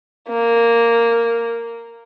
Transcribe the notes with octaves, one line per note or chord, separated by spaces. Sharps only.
A#3